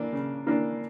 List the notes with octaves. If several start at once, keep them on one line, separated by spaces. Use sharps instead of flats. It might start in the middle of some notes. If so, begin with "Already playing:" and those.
Already playing: E3 A#3 D4
C#3
E3 A#3 D4